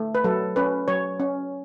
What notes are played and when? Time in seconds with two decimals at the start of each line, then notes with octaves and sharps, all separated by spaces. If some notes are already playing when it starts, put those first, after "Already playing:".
Already playing: A3
0.15 B4
0.24 F#3 A4
0.56 C#4 B4
0.88 F#3 C#5
1.20 C#4